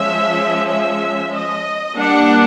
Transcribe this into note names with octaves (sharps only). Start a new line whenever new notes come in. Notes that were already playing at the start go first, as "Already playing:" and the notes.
Already playing: F3 G#3 C#4 E5
E5
D#5
G3 A#3 D4 F#5